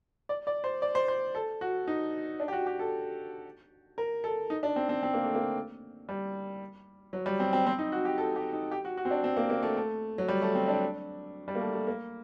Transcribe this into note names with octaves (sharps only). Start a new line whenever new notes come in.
D5
D5
C5
D5
C5
C5
A4
F#4
D#4
D4
G4
F#4
G4
A4
A#4
A4
D#4
D4
C4
C4
C4
A#3
A3
A#3
G3
F#3
G3
C4
C4
C4
D#4
F#4
G4
A4
G4
D#4
G4
F#4
F#4
C4
D4
C4
A#3
A#3
A3
A3
F#3
G3
A3
C4
D4
G3
A#3
A3
A3
A#3